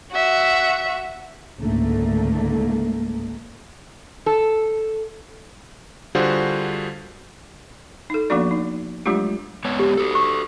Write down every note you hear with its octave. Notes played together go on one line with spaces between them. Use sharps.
F#4 E5
C#2 G#2 D3 A3 A#3
A4
D3 G3 F4 F#4 G#4 C5
D#4 A4
F3 A#3 B3 D4 F#4 D5
D#4
F#3 G#3 A3 D4 F4 G4
G#3 B3 C#5
G4
F#4 A4
C#6